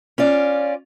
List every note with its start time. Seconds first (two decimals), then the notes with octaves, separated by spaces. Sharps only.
0.18 C#4 F4 D5